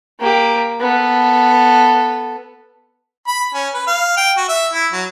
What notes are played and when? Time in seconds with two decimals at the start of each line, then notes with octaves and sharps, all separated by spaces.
0.20 A#3 G4
0.80 B3 A4
3.28 B5
3.54 C#4
3.73 B4
3.87 F5
4.17 G5
4.37 F#4
4.48 E5
4.73 E4
4.93 F#3